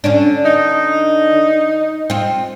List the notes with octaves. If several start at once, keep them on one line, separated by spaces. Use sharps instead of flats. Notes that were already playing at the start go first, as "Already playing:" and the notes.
D3 C#4 D4
D#4
C4 F4